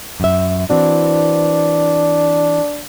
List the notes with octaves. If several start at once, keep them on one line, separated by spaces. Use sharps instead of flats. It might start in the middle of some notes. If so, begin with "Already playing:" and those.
F#2 E5
E3 C4 D4 F#4